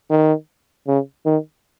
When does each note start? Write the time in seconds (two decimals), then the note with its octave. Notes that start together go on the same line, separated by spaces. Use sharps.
0.10 D#3
0.87 C#3
1.25 D#3